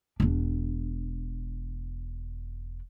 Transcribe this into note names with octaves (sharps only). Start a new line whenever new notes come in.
E1 D4